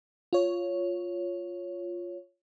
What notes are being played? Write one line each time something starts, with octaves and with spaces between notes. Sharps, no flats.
F4 C#5